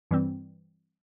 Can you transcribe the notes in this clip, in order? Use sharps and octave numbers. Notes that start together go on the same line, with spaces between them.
G2 E3 G3 C4